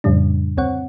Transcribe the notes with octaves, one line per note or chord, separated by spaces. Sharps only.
F2 A2 C#3 G3 D4
D2 C4 C#5 F#5